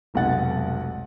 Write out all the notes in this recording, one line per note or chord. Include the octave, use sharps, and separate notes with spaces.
F1 B1 G#3 F#5 A6